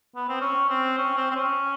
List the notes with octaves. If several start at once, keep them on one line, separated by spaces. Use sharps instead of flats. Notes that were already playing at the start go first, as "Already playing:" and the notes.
B3
C4
C#4
C4
C#4
C4
C4
C#4